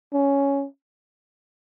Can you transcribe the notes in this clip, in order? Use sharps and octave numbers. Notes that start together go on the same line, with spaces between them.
C#4